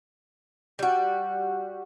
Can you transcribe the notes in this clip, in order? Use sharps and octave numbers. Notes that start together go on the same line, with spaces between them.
G3 F#4